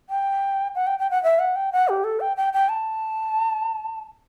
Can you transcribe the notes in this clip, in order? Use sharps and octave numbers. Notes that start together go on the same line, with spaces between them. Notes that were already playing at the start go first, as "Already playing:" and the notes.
G5
F#5
G5
G5
F#5
E5
F#5
G5
F#5
G4
A4
G5
G5
G5
A5